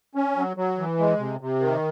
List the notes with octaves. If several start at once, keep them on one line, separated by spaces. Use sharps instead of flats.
C#4
F#3
F#3
E3
G#3
C3
C3
D#3